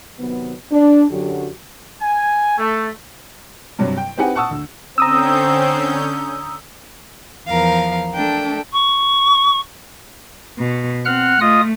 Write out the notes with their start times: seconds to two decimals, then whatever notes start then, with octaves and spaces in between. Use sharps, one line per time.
0.19 C3 D#3 F#3 B3
0.72 D4
1.11 F#2 D3 F#3 F#4 G4
2.01 G#5
2.58 A3
3.79 G2 C3 F#3 G3
3.97 G5
4.17 C4 D#4 G4 B4 F#5 G#5
4.35 F#5 A5 C#6 D#6 E6
4.51 D2
4.98 D3 C4 C#4 A#5 D#6 E6 G6
7.47 E2 F3 A#4 F5
8.14 A3 D4 G5
8.72 C#6
10.59 B2
11.05 C4 F#5 F6 F#6
11.41 A3 F4 D#5 D#6